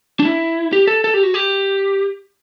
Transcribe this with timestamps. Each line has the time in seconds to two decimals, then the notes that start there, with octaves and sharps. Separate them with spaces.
0.19 D4
0.25 E4
0.73 G4
0.87 A4
1.04 A4
1.14 G4
1.23 F#4
1.34 G4